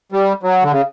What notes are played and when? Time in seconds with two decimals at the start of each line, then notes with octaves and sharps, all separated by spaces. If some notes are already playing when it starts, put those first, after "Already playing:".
0.12 G3
0.43 F#3
0.63 D3
0.71 C#3